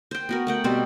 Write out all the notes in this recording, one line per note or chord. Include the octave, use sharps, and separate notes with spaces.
C5 G5
B3 F#4 A#4
A3 F#5 G5
B2 G3 C4 C5